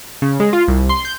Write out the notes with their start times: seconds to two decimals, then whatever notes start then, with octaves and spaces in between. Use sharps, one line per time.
0.22 C#3
0.40 G#3
0.53 F4
0.68 C2
0.89 C6
1.05 G6